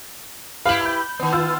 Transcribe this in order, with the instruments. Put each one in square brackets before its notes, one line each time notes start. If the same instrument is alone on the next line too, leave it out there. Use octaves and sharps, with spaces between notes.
[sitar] E4 G4 B4 [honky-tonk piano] F5 F#7
[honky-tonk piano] B5 G6
[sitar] D#3 B3
[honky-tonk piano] F4 E6